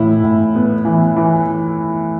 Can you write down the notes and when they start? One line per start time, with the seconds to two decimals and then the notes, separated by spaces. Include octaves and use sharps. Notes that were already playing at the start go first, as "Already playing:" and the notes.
Already playing: A2 E3 E4
0.23 A2
0.55 B3
0.85 E3
1.16 E3